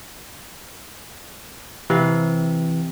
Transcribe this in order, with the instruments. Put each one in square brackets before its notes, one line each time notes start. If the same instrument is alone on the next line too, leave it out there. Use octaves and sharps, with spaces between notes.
[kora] C3 F5 [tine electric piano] E3